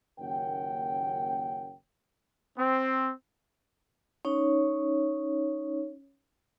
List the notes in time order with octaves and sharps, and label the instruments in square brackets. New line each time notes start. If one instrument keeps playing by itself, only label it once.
[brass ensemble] F#1 D#2 C#4 A#4 F#5 G5
[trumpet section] C4
[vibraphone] C#4 D#4 C#5